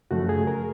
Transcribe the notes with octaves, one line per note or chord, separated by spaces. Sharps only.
F#2 C#3 F3 A3 F#4
G#4
A#4